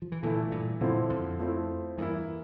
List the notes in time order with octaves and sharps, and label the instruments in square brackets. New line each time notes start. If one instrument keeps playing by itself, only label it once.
[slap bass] F3
E3
[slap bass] A#2 D3 [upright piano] E3 A3 E4
[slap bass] G2 A#2
[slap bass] G2 A#2 [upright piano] D3 F3 C4 E4
[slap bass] F2
[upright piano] F3 A3 C4 E4
[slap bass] E2 G2 [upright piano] E3 A#3 E4